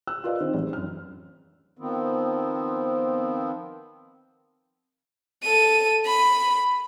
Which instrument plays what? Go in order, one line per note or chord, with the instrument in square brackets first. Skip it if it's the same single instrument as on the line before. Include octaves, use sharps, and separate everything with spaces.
[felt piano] E6 F#6
F4 A#4 B4 D5 D#5 F5
D#3 C4 C5
A1
F#2 F6
[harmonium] D#3 F3 B3 C4
[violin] A4 D#7
B5